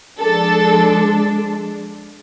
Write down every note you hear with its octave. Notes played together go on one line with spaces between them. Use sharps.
F3 G#3 D4 A4